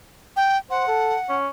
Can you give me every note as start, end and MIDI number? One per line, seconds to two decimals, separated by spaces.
0.36 0.58 79
0.70 0.87 72
0.70 1.36 78
0.88 1.15 69
1.29 1.48 61